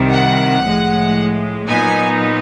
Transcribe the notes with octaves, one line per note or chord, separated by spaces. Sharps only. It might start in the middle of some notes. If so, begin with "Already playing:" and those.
Already playing: C2 C3 D#3 G3
F#5
A2 F3 G#3
A#2 F#3 B3 D#4 G#5